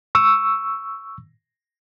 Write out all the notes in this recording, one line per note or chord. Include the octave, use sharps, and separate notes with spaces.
C#6 E6